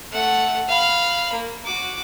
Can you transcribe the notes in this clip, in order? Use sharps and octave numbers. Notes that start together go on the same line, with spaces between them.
A3 F#5
F5 B5
A#3
F#4 D6